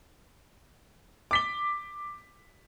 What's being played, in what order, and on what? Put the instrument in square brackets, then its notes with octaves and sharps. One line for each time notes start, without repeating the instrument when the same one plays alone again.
[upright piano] D6 B6 G7